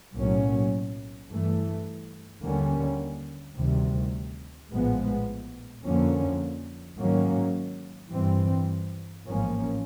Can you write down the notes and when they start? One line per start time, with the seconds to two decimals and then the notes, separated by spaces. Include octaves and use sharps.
0.14 B1 A2 F#3 A#3 C#4
1.28 G2 E3 A3
2.42 D#2 D3 G3 A#3 C#4
3.56 D2 C3 D#3 G3
4.69 A#1 A2 F3 G#3 B3
5.83 F2 D3 F3 A#3 C#4
6.97 G#2 D#3 F#3 A#3 C#4
8.11 G2 E3 G3 C4
9.24 A1 G#2 F3 A#3 C#4